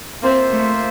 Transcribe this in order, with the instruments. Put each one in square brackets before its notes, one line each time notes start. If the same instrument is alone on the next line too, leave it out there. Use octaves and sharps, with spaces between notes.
[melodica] A#3 F4 C5 E5 [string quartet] C4
[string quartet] A3